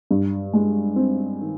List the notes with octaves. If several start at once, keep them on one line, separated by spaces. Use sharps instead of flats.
G2
G#3
C4
D#3